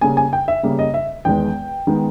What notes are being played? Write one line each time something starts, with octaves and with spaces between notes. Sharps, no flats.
C#3 G3 A#3 G#5
G#5
G5
E5
C#3 G3 A#3
D#5
E5
E2 D#3 G#3 B3 G5
D#3 G#3 B3